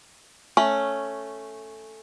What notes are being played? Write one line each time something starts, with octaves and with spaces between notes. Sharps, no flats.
A3 C#4